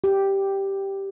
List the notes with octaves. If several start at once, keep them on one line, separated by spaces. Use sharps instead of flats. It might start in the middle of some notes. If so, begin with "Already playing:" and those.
G4